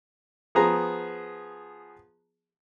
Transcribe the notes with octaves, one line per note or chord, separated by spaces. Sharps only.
F3 B3 G#4 A#5